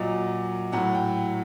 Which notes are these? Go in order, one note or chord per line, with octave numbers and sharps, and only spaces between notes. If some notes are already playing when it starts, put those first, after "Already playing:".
Already playing: A#2 F#3 D#5
A2 F#3 F#5
G5